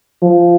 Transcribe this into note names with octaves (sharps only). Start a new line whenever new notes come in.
F3